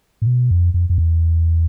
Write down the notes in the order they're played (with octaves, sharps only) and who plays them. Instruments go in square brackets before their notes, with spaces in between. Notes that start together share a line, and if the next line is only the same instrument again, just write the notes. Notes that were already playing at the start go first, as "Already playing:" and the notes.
[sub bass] A2
B2
F2
F2
F2
E2